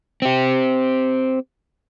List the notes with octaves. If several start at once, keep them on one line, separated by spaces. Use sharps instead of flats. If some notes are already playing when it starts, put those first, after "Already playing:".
C4 G4